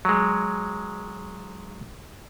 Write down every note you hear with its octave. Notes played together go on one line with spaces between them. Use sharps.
F#3 G#3